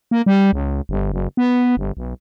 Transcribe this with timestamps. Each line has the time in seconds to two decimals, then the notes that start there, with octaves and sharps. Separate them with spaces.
0.11 A#3
0.26 G3
0.53 C#2
0.89 G1
1.12 F#1
1.37 B3
1.77 G1
1.97 B1